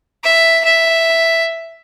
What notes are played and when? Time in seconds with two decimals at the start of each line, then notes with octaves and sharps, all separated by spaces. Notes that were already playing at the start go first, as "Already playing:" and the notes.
0.24 E5
0.65 E5